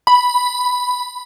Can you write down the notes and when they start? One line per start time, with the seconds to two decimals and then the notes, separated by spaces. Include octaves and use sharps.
0.07 B5